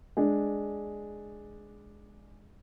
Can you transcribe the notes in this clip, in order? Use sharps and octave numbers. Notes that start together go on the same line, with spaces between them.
G#3 D4